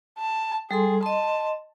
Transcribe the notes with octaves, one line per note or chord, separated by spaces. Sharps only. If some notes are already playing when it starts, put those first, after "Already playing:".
A5
G3 G#4 A4 C6
D#5 A5 C6